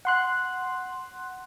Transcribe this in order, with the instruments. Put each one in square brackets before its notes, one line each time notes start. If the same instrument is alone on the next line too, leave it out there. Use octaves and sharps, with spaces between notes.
[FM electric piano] F#5 C6 F#6